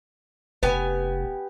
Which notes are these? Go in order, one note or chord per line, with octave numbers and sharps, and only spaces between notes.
F1 B3 G4 G#5